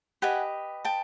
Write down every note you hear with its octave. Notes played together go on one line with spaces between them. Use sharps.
G4 B4 D#5 F#5 G#5
G5 A5